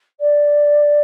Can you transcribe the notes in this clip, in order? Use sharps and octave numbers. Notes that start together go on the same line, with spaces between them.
D5